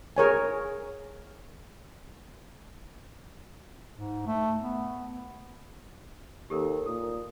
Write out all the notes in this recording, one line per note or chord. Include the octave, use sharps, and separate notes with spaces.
G#4 A#4 C#5 G#5
G#2
A3
B3
D#2 G4 A4 A#4
A#2 D#6